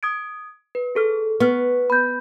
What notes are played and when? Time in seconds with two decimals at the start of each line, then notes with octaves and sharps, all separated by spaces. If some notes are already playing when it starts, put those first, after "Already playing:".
0.03 D#6 G#6 D7
0.75 B4
0.95 G#4 A4 F6
1.40 B3 C#6 F6
1.90 B5 G6